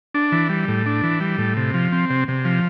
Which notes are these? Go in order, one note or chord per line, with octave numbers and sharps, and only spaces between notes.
D4
E3
G3
A2
D4
E3
G3
A2
C3
F3
C4
C3
C3
F3